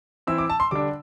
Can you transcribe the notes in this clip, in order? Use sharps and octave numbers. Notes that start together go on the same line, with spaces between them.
E3 C4 E4 E6
D6
A5
C6
D3 G3 D4 D6